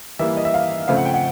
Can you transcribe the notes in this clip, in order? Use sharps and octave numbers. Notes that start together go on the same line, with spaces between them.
E3 G3 A#3 E5
D#5
E5
F5
C#3 F3 A3 C4 F5
F#5
G5
F#5